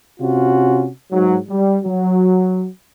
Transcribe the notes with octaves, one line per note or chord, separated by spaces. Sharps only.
C3 C#4 F4 F#4
G#2 F#3
G3
F#3